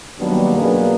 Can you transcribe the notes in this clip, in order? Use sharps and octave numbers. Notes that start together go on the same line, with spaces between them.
D#3 F#3 G3 A#3 B3 D4
F#2 B2 A#3 D4 G#4 B4